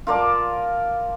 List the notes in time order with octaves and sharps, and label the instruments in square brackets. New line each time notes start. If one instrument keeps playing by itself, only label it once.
[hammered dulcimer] F4 A#4 D5 A5